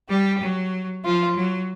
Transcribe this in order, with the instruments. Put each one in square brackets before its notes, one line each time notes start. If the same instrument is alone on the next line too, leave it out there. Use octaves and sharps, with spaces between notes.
[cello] G3 [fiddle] G4
[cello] F#3
[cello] F3 [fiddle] F4
[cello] F#3